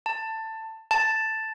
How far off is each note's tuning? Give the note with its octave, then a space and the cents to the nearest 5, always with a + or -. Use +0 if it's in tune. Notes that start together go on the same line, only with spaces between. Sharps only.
A5 +15
A5 +5